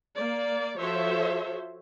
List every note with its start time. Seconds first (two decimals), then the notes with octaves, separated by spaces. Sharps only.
0.16 A#3 D5
0.78 F3 F#4 A4 C5 C#5 E5